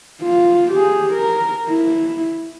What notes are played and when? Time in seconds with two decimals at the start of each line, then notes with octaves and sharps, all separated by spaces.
0.22 F4
0.71 G4 G#4
1.13 A#4
1.68 E4